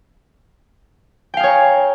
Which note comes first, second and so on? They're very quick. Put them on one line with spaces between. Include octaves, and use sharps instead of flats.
G5 F5 G#4 C#5 A#5